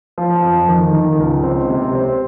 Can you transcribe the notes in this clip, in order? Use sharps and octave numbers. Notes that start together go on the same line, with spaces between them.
F3
F2
D#3
D#3
C#2
C4
C3
C4